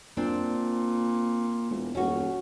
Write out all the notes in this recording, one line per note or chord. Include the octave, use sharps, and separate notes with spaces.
A#2 C4 D4
E1
D#1 C#4 F#4